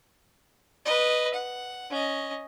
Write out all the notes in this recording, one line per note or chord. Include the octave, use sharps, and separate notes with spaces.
B4 D#5
F#5
C#4 D#5